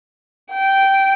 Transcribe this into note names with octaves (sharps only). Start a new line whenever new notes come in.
G5